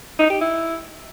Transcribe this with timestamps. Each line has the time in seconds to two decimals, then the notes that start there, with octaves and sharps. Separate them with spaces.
0.19 D#4
0.30 G4
0.41 E4